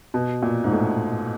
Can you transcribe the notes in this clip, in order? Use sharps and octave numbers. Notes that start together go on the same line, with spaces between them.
B2
A#2
G#2
A2